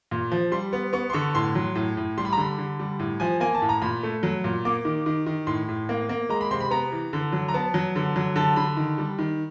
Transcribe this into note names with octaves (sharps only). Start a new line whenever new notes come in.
A#2
F3
G3 C6
B3
B3 C#6
C6
D3 C#6
A2 C6
F#3
A2
A2
G3 C6
B5
A#5
D3 B5
D3
G3
A2
F3 G#5
A#3 G#5
A5
A2
A#5
A#2 B5
A3
F#3
A#2
A#3 D6
D#3
D#3
D#3
A2 C6
A2
A#3
A#3
G#3 A#5
B5
C3 C6
B5
B3 A#5
E3
D3
F#3
A#5
B3 A5
F#3
D3
F#3
D3 A5
D3 B5
D#3
G3
D#3